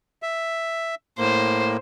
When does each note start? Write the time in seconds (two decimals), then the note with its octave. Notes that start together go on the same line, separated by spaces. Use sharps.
0.22 E5
1.18 A2 A#3 C5